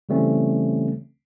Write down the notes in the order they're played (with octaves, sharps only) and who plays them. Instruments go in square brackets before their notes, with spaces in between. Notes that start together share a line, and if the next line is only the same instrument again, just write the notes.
[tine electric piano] C#3 E3 G3 A3 C4 C#4